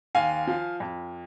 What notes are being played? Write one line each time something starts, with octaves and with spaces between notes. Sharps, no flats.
D#2 F5 G#5
F3
F2